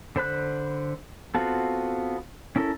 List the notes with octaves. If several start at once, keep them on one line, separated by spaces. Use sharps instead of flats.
D3 C5 B5 F#6
B3 C4 F4 F#4 A4
C#4 E4 A4 A#4